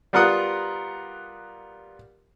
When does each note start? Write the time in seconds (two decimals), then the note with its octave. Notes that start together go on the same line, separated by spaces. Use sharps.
0.13 G3 B3 F4 A#4 F#5 D#6